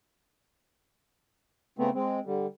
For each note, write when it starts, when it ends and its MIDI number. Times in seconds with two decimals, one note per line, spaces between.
1.79 1.90 49
1.79 1.90 57
1.79 1.90 59
1.79 1.90 60
1.94 2.20 56
1.94 2.20 60
2.26 2.46 50
2.26 2.46 55